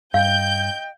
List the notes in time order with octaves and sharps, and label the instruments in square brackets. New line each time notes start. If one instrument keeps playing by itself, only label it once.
[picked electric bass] G2 [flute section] D#5 G5 [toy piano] F5 [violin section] G6